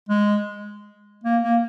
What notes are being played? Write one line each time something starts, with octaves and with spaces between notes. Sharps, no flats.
G#3
A#3
A#3